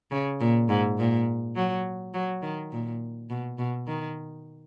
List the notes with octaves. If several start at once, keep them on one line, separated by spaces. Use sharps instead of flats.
C#3
A#2
G#2
A#2
F#3
F#3
D#3
A#2
B2
B2
D#3